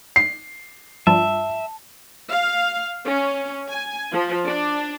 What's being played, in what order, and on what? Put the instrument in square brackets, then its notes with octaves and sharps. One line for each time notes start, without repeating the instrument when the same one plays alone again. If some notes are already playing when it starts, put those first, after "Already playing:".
[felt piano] C7
[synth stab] G2 F3 [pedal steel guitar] E5 [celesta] A5
[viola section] F5
C#4
G#5
F3
D4